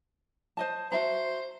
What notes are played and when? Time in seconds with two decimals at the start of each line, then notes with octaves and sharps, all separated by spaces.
0.57 C5 D#5 A5
0.92 F#4 C5 E5 A#5